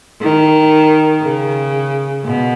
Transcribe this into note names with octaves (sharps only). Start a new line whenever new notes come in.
D#3
C#3
B2